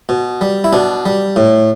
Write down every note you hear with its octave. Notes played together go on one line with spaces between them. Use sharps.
B2
G3
E4
B2 D4
G3
A2